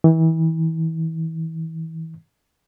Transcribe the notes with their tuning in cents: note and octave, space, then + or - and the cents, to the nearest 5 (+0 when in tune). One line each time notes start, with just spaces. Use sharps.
E3 -30